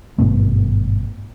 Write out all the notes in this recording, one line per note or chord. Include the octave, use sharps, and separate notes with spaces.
G#1 G2 B2 A3